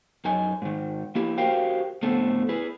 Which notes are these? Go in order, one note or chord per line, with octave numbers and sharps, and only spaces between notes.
F#2 D#4 G#5
G#2 D#3
A#3 E4 G4
F#4 G4 A#4 C5 F5 G5
A2 D3 A3 B3 C4 A4
E4 G#4 B4